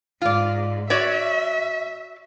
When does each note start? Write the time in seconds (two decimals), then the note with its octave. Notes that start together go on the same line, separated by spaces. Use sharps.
0.21 G#2 F4 D5
0.90 F#4 C#5 D5 E5